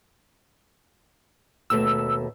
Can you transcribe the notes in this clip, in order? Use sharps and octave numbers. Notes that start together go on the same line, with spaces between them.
D#2 B2 A3 E6